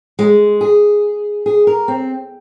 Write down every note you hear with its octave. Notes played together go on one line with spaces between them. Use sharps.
G#3
G#4
G#4
A#4
C4